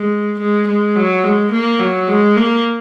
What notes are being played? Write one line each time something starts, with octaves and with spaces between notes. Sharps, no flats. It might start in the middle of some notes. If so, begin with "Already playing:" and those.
Already playing: G#3
G#3
G#3
F#3
G#3
A#3
F#3
G#3
A#3